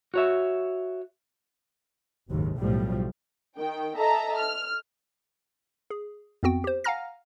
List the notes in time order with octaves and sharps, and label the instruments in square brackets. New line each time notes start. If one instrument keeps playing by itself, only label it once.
[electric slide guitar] F#4 C#5 E5
[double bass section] F#1 D#2 G#2
B1 A2 F3 G3
[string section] D#3 G5
A4 D#5 E5 A5 A#5
F6
[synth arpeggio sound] G#4
F2 B3 C4 F#4 G5
G4 C5
F5 F#5 G#5 A#5 F6 A#6